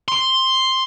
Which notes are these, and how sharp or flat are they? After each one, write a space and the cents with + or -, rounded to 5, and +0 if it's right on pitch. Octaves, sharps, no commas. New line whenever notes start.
C6 +5